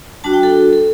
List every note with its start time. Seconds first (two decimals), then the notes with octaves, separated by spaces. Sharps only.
0.24 G3 D4 F#4 A5
0.34 G5
0.43 A4
0.73 A4